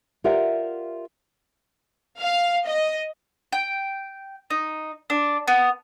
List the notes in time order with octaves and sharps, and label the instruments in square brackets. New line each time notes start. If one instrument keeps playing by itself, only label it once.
[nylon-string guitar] F4 G4 A#4 D5 E5 F#5
[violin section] F5
D#5
[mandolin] G5
D#4
D4
B3